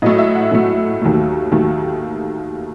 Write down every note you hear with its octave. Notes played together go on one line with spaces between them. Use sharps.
A2 F#3 A3 D#5
E5
F#5
A2 F#3 A3
D#2 D#3 F#3 A3
D#2 D#3 F#3 A3